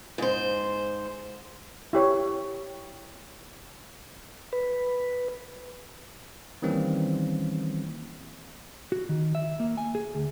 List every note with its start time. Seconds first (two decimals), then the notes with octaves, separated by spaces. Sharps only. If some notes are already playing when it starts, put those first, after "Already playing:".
0.18 G#2 C5
1.93 E4 G4 C#5
4.53 B4
6.62 D#3 E3 G3 A#3 C4 C#4
8.92 F#4
9.09 D#3
9.35 E5
9.60 A#3
9.77 G#5
9.95 G#4
10.15 D2